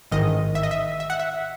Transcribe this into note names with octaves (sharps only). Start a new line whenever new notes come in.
A1 G#2 D#3 D#5
E5
D#5
E5
E5
F#5
E5